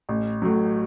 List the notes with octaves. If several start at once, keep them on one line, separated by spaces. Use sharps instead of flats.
A1
A2 F#3